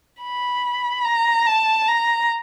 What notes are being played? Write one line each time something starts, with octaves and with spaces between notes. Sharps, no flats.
B5
A#5
A5
A#5